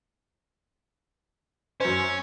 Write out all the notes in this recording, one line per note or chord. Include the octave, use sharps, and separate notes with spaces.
F#2 C#4 C5